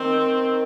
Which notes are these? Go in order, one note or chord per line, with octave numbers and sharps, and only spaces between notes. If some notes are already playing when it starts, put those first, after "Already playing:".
Already playing: D#3 C4